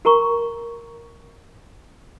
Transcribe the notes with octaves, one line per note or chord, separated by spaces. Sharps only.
F#4 A#4 A#5 C#6